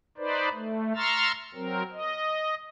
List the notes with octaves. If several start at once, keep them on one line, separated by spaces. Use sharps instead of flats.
D#4 B4 C5 D5
A3
A#5 C6 C#6 E6 F6 A6
F#3 C4 A#4
D#5